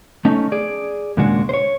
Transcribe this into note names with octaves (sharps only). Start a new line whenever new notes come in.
A3 C#4 D#4
G#4 D5
D#2 A#2 C#3 G#3 D4 F#4
C5 C#5